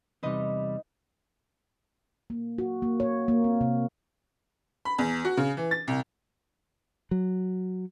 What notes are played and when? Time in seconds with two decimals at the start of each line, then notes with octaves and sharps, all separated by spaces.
0.23 E2 C3 G3 D#4 B4 D#5
2.30 A#3
2.58 F#4
2.82 A#3
3.00 C#5
3.28 A#3
3.44 C4
3.61 C3
4.85 B5
4.98 E2
5.25 F#4
5.37 C#3
5.57 E3
5.71 A6
5.88 C2
7.11 F#3